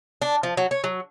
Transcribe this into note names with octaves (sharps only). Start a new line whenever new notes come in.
D4
F3
F#3
C#5
F#3